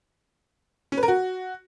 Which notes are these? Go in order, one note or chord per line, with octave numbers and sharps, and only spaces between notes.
C#4
B4
A#4
F#4